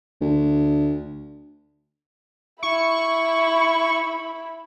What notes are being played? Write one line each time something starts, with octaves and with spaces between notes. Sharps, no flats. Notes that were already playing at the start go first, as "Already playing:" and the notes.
D2
E4 B5 C#6